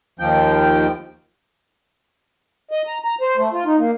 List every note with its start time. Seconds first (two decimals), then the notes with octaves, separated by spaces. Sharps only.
0.19 D#2 F3 G5
2.71 D#5
2.87 A#5
3.04 A#5
3.21 C5
3.37 A3
3.52 F4
3.65 D#4
3.78 A#3